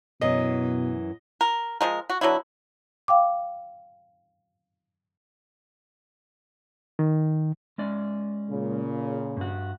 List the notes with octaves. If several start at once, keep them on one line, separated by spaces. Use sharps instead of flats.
F#2 B2 E3 D#5
A#4
F3 G#3 A#4
F#4
D3 F#3 B3 E4
F5 G5 D6
D#3
G#3 C#4 D5
A#2 C#3
G2 F#4